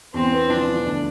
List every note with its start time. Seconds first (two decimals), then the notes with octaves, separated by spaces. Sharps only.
0.14 E2 C4
0.32 B3
0.49 F3 D4
0.68 F3
0.85 D2